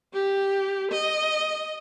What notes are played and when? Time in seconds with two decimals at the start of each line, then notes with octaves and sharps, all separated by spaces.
0.13 G4
0.91 D#5